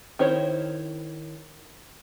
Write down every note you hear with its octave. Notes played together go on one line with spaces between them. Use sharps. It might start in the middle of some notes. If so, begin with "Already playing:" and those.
D#3 E4 C5 C#5